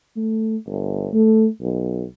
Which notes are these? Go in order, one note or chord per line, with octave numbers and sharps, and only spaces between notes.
A3
G1
A3
B1